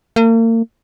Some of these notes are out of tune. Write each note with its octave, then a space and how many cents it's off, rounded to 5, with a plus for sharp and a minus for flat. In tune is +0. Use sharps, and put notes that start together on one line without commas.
A#3 -40